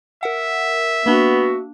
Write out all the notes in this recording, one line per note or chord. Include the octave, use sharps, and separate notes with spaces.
A#4 E5 F#5
A#3 B3 D4 F#4